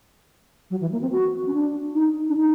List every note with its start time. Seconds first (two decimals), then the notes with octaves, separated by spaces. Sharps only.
0.71 F#3
0.81 E3
0.92 A#3
1.01 C4
1.12 F#4
1.47 C#4
1.54 D4
1.94 D#4
2.29 D4
2.37 D#4